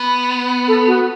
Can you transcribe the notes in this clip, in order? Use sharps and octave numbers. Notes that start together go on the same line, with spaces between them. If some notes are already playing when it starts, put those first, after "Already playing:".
Already playing: B3
A4
F#4